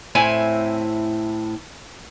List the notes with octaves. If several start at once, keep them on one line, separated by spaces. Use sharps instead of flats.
A2 C4 E4 G#5